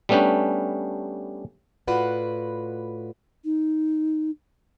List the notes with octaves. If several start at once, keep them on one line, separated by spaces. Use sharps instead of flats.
G3 A3 B3 C#4 D4 G4
A2 F4 F#4 B4 D5 F#5
D#4